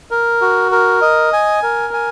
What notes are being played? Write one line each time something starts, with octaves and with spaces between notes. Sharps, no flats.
A#4
F#4
A#4
D#5
G#5
A#4
G#5